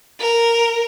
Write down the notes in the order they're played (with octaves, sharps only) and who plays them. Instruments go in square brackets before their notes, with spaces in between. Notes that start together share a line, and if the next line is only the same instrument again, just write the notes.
[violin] A#4